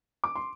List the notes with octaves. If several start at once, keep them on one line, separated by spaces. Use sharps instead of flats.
D6
C6